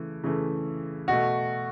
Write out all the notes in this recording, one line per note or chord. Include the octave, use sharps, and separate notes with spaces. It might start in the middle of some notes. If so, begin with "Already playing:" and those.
Already playing: C#3 E3 A3
C#3 E3 A3
B2 A3 F#4